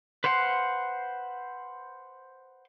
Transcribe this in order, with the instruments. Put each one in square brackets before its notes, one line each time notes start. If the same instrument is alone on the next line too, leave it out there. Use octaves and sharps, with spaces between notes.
[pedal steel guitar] B4 C5 F5 F#5 C6